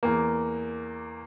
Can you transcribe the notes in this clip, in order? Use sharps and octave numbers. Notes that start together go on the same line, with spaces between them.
E2 A#3